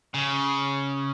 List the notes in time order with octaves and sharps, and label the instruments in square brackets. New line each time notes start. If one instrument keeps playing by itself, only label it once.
[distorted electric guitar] C#3